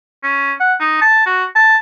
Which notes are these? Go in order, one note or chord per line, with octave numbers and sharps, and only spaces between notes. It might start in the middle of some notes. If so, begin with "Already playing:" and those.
C#4
F#5
D#4
A5
F#4
A5